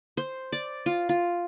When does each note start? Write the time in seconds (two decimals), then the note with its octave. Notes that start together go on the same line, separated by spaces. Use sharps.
0.17 C5
0.52 D5
0.86 F4
1.09 F4